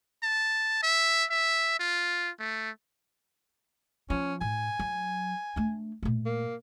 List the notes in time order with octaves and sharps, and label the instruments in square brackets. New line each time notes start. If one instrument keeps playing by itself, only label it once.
[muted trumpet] A5
E5
E5
F4
A3
[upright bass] F3 [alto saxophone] C#4
[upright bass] A2 [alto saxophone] G#5
[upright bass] F#3
A3 D4
A#2 A3
[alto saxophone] A#3